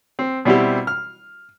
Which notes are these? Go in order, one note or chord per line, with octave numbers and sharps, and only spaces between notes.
C4
B2 G3 C4 E4 F#4 G4
F6